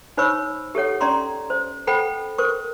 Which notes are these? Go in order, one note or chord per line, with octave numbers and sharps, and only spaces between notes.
D#4 C5 C#5 B5 C#6 E6
G4 A4 C#5 F#5
C#4 D5 A#5 C6 C#6
C5
A4 C5 F#5 G5 B5
A#4 C5 C#6